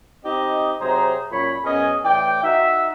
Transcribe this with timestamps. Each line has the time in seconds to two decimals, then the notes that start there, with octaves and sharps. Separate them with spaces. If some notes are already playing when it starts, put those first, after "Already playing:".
0.24 C4 D#4 G4 D#5
0.79 C3 F#3 G#4 C5 A#5
1.31 F#2 A#2 C#5 B5
1.64 F#2 B3 C#4 G#4 D#5 G#5
2.04 A2 E3 D5 G5
2.43 D#4 F#4 E5